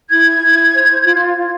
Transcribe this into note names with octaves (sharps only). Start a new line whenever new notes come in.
E4 G#6
E4
C5
F4
F4